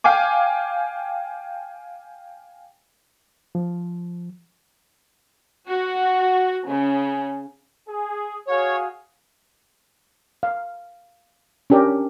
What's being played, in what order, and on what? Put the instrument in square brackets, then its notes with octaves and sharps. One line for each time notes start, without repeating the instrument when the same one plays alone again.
[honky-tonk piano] F5 G5 G#5 D6
[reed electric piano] F3
[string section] F#4
C#3
[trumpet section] G#4
[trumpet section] F#4 G#4 F5 [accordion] C#5
[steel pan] F5
C#4 D4 G4 A#4 D5